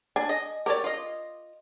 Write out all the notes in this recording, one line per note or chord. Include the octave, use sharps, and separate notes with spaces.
D4 G#5
D#5
G4 A#4 C#5 D5
F4 D#5